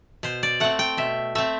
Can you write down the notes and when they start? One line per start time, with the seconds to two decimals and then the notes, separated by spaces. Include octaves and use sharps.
0.23 B2 C5
0.43 D5
0.60 A3 C4 F#5
0.79 G5
0.97 B2 E5
1.35 A3 C4 E5